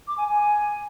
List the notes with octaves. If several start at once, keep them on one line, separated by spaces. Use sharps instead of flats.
D6
G#5
G#5